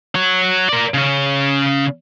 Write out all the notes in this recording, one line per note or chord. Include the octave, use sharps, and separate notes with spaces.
F#4 C#5
A#4 D5
C#3 C#4